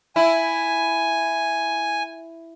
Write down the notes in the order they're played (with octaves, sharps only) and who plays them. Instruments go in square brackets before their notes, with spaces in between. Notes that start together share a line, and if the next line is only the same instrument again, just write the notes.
[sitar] E4 [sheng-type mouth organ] G#5